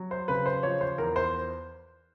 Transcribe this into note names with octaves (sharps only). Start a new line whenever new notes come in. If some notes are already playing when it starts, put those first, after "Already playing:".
Already playing: F#3
C5
C#3 B4
C5
F3 C#5
C5
E2 A#4
C5